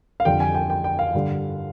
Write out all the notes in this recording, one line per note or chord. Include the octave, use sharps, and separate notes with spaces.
F5
F2 D3 G3 G5
G#5
G5
G5
G5
F5
G2 D3 G3